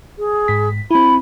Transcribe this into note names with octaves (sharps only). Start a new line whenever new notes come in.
G#4
G#2 B6
C4 E4 B5